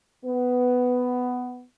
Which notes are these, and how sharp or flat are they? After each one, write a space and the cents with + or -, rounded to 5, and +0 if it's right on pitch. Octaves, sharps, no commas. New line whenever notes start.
B3 +10